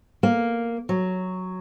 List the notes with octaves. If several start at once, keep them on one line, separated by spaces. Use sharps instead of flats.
A#3
F#3